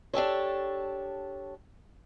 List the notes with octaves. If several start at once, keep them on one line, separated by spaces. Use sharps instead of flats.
D4 G4 A4 C#5